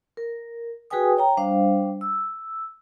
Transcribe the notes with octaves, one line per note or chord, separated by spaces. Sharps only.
A#4
F#4 G#4 B4 G5 G#5 D#6
C#5 G5 A#5
G3 D4 C5 F5
E6